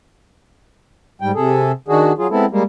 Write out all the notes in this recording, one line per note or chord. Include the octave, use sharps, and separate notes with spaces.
G#2 G3 G5
C3 G#4 A4
D#3 D4 F#4 G#4
F#3 F4 G#4
G#3 B3 C4 E4 A4
G3 G#3 A#3